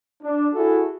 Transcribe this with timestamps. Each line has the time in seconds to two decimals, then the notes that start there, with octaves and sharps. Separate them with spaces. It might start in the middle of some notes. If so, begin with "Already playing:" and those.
0.23 D4
0.54 E4 F#4 G#4 A4